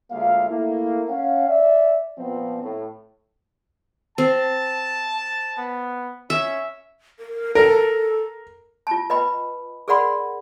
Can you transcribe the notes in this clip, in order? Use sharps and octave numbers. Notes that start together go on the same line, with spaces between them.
D2 G#3 A#3 F4 E5 F5
A3 A#3 E4
C#4 F5 F#5
D5 E5
A#2 F3 B3 C4
A2
C4 A5
B3
C#4 E5
A#4
A4 A#4
F4 A5
B4 D#5 G5 B5
G#4 A#4 D5 F#5 B5 C6